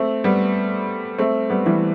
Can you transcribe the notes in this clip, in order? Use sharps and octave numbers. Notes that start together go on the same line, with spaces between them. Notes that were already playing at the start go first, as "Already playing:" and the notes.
Already playing: A3 C4
G3 B3
A3 C4
G3 B3
E3 G3